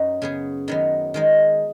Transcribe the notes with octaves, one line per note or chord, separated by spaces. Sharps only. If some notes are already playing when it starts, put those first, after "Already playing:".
Already playing: F#2 F#3 D#4 F#4 B4
C#3 B3 G#4
D#3 F#3 B3
D#3 G#3 D#4